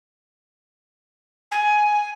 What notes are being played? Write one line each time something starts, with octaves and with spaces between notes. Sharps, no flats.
G#5